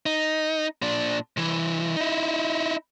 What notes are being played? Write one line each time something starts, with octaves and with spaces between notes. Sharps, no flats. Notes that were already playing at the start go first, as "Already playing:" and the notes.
D#4
A#2 D4
C2 E3
D#4 E4